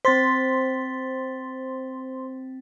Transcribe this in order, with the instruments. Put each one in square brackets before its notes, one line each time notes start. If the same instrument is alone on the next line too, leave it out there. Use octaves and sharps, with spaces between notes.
[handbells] C4 A6 B6 [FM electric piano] C5 C6